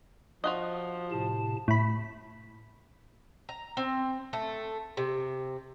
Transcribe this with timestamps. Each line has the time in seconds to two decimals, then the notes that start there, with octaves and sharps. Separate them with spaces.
0.44 F3 F4 F#4 D#5
1.11 A2 C3 A5
1.68 A2 B5
3.49 A#5
3.77 C4
4.33 A3
4.97 C3